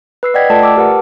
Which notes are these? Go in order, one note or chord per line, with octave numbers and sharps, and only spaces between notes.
B4 E6 C7
D5 D#5 F#5 G5 G#6 B6
A3 F4 A4 D5 A5
A5 D6 E6
G4 A#4 B4 F#5